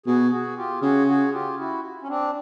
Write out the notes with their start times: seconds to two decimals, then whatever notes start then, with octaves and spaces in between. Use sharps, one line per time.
0.06 B2 F#4 G#4
0.31 F#4 G#4
0.56 F4 G4
0.82 C#3 F#4 G#4
1.07 F#4 G#4
1.33 F4 G4
1.58 E4 F#4
2.02 C#4
2.08 C4 D4